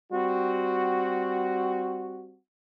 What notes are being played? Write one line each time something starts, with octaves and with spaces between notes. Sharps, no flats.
G3 C4 F#4